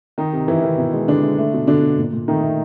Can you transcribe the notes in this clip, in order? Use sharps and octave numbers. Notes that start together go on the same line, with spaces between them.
D#3 D#4
C3
C3 E3 E4
D#3
B2
G#3
D3 G#3 D4
G#3
A3
B2
B2 D3 D4
B2
A#2
A#2
D#3 A3 D#4
A3